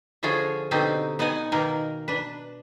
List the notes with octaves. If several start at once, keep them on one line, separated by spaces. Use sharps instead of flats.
D3 F3 F4 F#4 G#4 C#5
B2 D3 C4 D#4 F#4 G4
B3 D#4 D#5 F#5 G#5
B2 D#3 A#3 A#4
D4 B4